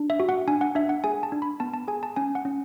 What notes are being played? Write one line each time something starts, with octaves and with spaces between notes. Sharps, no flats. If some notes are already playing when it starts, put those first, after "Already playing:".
Already playing: D4
E5
F#4
F#5
D4 G#5
F#5
D4 E5
F#5
G#4 G#5
A5
D4
B5
B3 A5
A5
G#4 G#5
A5
C#4 G#5
F#5
C#4